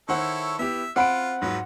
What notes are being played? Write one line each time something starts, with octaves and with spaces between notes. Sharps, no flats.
D#3 E4 A4 C5 C#5 F#5
B3 E4 G4 E5
C4 F4 F#5 B5 D7
G#2 F3 F#3 B4